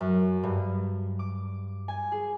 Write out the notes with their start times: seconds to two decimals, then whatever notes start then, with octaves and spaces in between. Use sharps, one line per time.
0.01 F#2
0.43 G2
1.19 D6
1.88 G#5
2.12 G#4